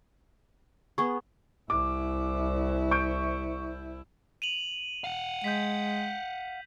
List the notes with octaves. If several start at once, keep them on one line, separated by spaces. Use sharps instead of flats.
B3 G#4 C#6
C2 E4 D6
C#6 G6 D7
D#7 F7 F#7
F5 F#5
G#3 G6 B6